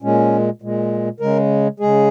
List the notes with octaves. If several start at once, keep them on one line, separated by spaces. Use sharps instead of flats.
A#2 G#3 C#4
A#2 G#3
C#3 G#3 A#4
C#3 G#3 G#4